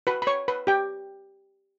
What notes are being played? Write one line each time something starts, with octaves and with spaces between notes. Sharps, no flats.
F#4 B4 B5
B5
C#5 C#6
B4 B5
G4 G5